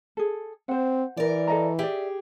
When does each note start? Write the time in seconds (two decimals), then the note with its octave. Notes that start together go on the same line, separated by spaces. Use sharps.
0.17 G#4 A4
0.69 C4 C5 F#5
1.17 E3 A#4 D5
1.47 A4 D#5 A#5
1.79 G4 G#4 D5 E5